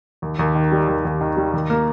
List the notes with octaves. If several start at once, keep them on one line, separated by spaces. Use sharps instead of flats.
D#2
D#2
D#3
G3
D#2
D#2
D#3
G3
D#2
A#3